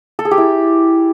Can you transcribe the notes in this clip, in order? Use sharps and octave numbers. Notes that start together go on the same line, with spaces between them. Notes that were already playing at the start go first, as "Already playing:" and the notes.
A4
G#4
G4
E4